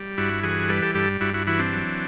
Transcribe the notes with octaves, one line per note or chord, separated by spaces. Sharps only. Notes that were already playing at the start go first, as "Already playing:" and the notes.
Already playing: G3
G2 E4 F#4
E3 F#4 G#4
G3 A4 B4
G4 A4
G2 G4 A4
G2 E4 F#4
E4 F#4
E3 E4 F#4
C4 D4
F#3